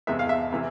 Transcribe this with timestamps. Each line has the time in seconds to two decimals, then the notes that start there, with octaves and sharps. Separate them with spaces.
0.07 E2 C3 G#3 B3 E5
0.19 F5
0.29 E5
0.52 C3 E3